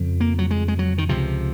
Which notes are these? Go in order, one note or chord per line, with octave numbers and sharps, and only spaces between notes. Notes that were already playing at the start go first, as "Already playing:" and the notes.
Already playing: F2 C#3
A#3
F#3
G#3
G#3
F#3
D#3
C#2 C3 F3